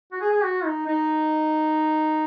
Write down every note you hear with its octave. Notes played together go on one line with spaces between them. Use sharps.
F#4
G#4
G#4
F#4
D#4
D#4